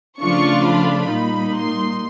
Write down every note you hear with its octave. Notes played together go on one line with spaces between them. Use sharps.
C#3 F3 A3 D4 F4 C#6
B5
A#2 G3 A#3 D#4
C6